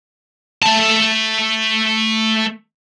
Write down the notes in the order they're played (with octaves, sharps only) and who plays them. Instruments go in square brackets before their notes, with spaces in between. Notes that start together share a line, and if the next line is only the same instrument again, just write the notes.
[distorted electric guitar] A3 A5